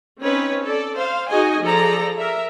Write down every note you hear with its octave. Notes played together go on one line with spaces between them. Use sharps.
C4 C#4 D#4 B4 C#5
A4 D5
C5 F5
D#4 F#4 G#4 D#5 G#5
F3 G#4 A4 D5 A#5
A#4 E5